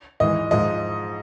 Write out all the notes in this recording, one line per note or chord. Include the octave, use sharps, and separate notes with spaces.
G#2 E3 G#3 D#5
G#2 F3 G#3 D#5